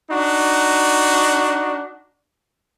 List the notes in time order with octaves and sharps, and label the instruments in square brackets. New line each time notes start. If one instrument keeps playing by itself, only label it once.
[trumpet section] D4 D#4 F#4